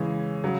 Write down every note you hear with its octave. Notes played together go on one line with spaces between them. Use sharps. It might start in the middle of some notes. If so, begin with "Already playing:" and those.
Already playing: C#3 E3 G#3 C#4
C#3 F#3